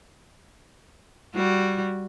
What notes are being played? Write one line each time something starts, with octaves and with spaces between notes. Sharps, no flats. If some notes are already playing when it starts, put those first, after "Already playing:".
G3 F#4